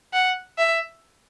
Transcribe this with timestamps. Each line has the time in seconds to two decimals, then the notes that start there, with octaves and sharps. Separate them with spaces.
0.13 F#5
0.58 E5